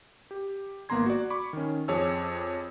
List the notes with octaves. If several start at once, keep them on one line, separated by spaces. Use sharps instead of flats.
G4
G#1 A#3 B3 A#5 C6 G#6
F#4 D5
B5 C#6 D6
D#3 C#4
F2 G#4 C#5 A5 E6